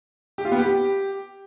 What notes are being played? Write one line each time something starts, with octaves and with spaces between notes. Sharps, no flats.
G4
F4
B3
G4